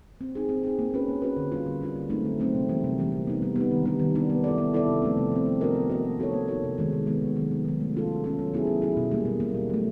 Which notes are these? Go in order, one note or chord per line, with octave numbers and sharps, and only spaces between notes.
C4
D#4 G#4
C4
D#4 G#4
A#3
C#4 F#4 B4
A#3
C#4 F#4 B4
D3
G3 A#3 D4 F4
D3
G3 A#3 D4 F4
D3
F#3 A3 C4 D#4
D3
F#3 A3 C4 D#4
C3
E3 G3 A#3
C3
E3 G3 A#3
G3
B3 D#4
G3
B3 D#4
D#3
G3 B3 D4
D#3
G3 B3 D4
B3
E4 A4 D5
B3
E4 A4 D5
C3
F3 A3 C4
C3
F3 A3 C4
B3
D4 F#4 A#4 D#5
B3
D4 F#4 A#4 D#5
A#3
D#4 F#4 A4 C#5
A#3
D#4 F#4 A4 C#5
C3
D#3 G#3 B3 D#4
C3
D#3 G#3 B3 D#4
C3
D#3 F#3
C3
D#3 F#3
A3
C#4 F4 A4
A3
C#4 F4 A4
F#3
B3 E4 G#4
F#3
B3 E4 G#4
B2
G3 A#3
B2
G3 A#3
B2
F#3 A3